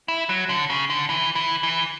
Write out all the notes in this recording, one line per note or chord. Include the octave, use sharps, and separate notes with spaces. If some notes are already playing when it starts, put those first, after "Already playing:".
E4
F#3
D3
C#3
D3
E3
E3
E3